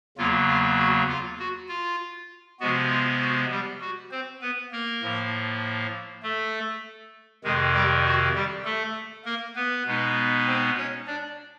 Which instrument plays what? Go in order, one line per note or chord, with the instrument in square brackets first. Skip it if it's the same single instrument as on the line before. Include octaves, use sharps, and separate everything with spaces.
[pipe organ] E2 C#3 F#3 A#3 F4
F4
F#4
F4
F#4
F4
C3 F3 G#3 B3 F#4
F4
F#4
G3 G4
F#4
C4 C5
B3 B4
A#3 A#4
A2 F3 A#3
A3 A4
F2 C3 D#3 G#3 G#4
G3 G4
F#4
G3 G4
A3 A4
A#3 A#4
B3 B4
B2 G#3 B3 D#4
C4 C5
C#4 C#5
D4 D5